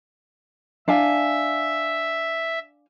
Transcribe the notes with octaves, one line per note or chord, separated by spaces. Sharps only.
D4 E5 F5 G#5